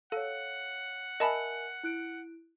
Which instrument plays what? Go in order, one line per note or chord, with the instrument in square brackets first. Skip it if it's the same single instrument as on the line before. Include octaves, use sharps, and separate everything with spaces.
[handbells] A4 [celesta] C#5 F5 [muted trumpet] F#5
[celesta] A#4 E5 G#5 [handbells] D#5 A5 B5
[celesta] E4 F#6 D7